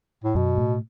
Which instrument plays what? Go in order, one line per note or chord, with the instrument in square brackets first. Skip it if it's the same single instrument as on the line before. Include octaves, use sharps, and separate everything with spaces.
[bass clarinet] A2
[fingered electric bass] F#2 [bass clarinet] B2
[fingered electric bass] A2